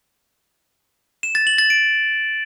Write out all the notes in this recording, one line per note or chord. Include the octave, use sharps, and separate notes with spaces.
E7
A6
F#7
A6
D7